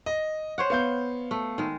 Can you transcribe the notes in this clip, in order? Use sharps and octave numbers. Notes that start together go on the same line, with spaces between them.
D#5
C5 C#5 F#5
B3 F5 G6
A3
D#3 G#3